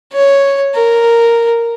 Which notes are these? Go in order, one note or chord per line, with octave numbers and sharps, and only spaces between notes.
C#5
A#4